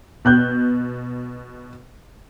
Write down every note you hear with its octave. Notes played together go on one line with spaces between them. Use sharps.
B2 F#6 G6